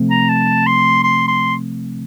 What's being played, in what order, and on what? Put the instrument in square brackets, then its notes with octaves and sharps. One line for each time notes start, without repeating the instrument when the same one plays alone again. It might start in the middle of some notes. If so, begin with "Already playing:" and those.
Already playing: [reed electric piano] C3 F3 A3 C4
[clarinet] A#5
A5
C6
C6
C6